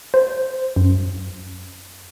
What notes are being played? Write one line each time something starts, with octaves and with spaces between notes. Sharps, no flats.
C5
F#2